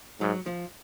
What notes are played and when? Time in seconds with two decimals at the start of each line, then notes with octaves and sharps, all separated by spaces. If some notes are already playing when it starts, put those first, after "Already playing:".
0.20 G#2 F#3
0.46 F3